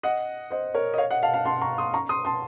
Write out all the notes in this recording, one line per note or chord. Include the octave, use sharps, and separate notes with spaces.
D#5 F#5
C5 D#5
A#4 C#5
D#5
C#5 F5
D#5 F#5
F5 A5
F5 A5
A5 C6
A#5 C#6
C6 D#6
A#5 C#6
C6 D#6
A5 C6